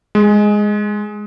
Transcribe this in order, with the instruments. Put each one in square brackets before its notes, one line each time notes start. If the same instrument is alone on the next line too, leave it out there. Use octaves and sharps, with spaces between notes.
[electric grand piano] G#3